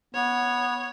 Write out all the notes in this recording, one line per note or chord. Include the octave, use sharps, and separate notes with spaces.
B3 C#5